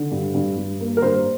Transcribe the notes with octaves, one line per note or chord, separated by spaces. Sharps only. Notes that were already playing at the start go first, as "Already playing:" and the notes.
Already playing: D3
G2
G2
G2
A#3
A#4
G2 C5